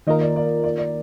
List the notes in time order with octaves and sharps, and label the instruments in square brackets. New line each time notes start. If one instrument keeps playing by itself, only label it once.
[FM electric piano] D#3 A#3 F4 A#4 [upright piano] D#5
[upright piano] D5
D5
D5
D5